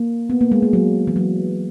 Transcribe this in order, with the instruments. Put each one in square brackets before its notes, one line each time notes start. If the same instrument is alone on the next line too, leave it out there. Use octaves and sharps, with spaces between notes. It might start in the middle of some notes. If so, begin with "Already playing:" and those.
Already playing: [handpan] A#3
B3
A#3
G#3
A#3
F#3
E3
F#3